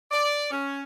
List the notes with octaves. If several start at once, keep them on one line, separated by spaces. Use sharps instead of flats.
D5
C#4